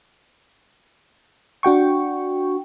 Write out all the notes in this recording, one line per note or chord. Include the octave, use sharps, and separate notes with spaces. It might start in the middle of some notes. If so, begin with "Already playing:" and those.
D4 F#4 G5 C#6